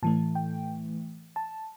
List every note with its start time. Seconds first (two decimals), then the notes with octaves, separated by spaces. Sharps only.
0.03 A2 E3 A3 A5
0.35 G5
1.36 A5